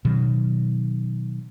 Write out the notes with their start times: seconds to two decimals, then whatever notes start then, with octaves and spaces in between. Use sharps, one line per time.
0.05 B2 D#3 F#3